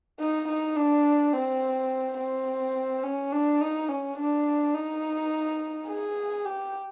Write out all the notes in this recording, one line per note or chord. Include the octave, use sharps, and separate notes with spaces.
D#4
D#4
D4
C4
C4
C#4
D4
D#4
C#4
D4
D#4
G#4
G4